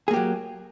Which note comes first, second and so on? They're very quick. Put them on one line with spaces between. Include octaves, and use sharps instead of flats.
G#4 A#3 G4 F#3